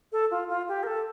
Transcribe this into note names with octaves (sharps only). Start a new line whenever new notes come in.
A4
F4
F4
G4
A#4
A4